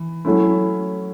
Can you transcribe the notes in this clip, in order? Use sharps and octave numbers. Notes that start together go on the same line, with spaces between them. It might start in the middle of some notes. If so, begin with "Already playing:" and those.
Already playing: E3
F#3 A3 C#4 E4